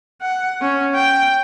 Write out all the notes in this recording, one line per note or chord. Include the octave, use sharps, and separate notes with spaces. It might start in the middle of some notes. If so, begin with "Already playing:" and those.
F#5
C#4
G5